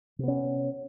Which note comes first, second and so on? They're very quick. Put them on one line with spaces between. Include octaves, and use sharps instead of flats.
C3 B3 C#4